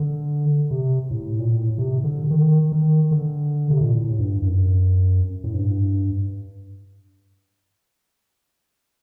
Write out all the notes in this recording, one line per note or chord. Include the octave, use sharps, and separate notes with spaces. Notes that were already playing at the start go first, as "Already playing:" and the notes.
Already playing: D3
C3
A2
A#2
A2
C3
D3
D#3
D#3
D3
C3
A#2
A2
G2
G2
F#2
A2
G2